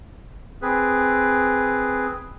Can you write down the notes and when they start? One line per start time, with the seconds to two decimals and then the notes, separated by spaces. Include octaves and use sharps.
0.62 C4 G#4 B4